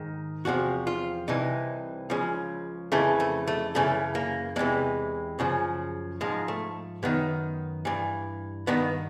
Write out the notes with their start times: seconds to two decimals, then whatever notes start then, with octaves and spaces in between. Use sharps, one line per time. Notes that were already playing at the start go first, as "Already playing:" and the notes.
Already playing: G#2 D#3
0.45 E2 C3 F3 F#4
0.87 F4
1.28 C2 C3 E3 D#4
2.10 C#2 C#3 F3
2.92 F2 C#3 E3 A3
3.20 A3
3.47 A3
3.75 F#2 C#3 E3 A3
4.15 A#3
4.56 E2 C3 E3 G#3
5.39 F#2 C#3 F3
6.21 G#2 F3 G#3
6.48 A3
7.03 F#2 D#3 B3
7.85 G2 E3
8.67 G2 D#3 B3